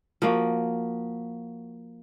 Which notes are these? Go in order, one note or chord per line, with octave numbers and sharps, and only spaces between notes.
F3 A#3 F#4